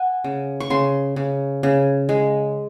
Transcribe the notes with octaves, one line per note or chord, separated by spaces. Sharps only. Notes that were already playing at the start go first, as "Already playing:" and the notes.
Already playing: F#5 G#5
C#3
C#6
C#3 C6
C#3
C#3
G#3